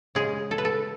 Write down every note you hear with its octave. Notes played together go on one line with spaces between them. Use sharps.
C#3 G#3 G#4
A4
B4
A4